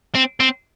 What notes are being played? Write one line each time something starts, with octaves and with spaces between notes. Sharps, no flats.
C4
C4